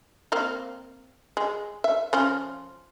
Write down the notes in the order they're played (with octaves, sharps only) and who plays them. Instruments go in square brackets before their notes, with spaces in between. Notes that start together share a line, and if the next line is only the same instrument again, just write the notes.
[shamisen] A#3 C4 F5
G#3
E5
F3 C#4